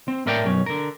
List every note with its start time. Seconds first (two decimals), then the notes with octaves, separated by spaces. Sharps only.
0.08 C4
0.26 A2 A3 A#4 D5 F5 G5
0.45 B1 F#2 C#4
0.66 D3 A#4